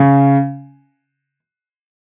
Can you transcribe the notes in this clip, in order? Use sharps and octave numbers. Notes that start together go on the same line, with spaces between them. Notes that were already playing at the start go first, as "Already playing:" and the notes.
Already playing: C#3